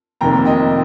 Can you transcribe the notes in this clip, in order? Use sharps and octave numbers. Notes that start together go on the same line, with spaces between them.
F1 F2 C3 D#3 A#3 G5 A#5
D#5 G5